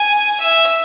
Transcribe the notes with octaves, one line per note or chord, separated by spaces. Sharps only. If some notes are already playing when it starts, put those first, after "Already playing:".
Already playing: G#5
E5